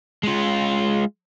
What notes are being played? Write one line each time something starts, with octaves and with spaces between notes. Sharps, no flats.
G#3 F4